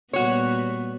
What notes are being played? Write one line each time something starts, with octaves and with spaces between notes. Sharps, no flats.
A#2 G3 B3 F#4 C#5